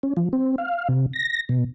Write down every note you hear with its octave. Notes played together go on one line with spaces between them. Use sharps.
C#4
F3
C4
F5
C3
A#6
B2